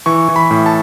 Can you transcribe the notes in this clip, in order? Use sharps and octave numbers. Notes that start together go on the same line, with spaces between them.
E3 C#6
E3
B5
A2
A5